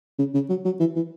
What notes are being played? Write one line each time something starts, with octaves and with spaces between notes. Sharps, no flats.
C#3
C#3
F#3
F#3
E3
E3